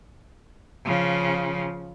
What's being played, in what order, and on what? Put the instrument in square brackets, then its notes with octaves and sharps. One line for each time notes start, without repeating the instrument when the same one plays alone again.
[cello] C#3 F3